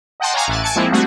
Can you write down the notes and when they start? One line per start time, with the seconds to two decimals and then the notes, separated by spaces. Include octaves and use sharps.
0.20 D#5 F#5 G5 A5 C6
0.34 C#5 F5 F#5 G#5 A#5 D6
0.48 A1 E5 G#5 F#6 A6
0.62 G#5 A5 C#7 D7
0.76 F3 G#3 A#3 C4 E4
0.92 G3 A3 C4 D4 F#4 G#4